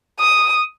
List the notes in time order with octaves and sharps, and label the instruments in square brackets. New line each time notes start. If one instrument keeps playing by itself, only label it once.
[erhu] D#6